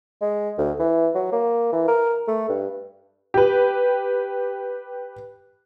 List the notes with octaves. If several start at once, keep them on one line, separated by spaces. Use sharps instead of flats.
G#3
D2
E3
F#3
A#3
E3
A#4
A3
G2
G4 B4